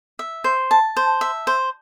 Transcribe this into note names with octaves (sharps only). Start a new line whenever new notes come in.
E5
C5
A5
C5
E5
C5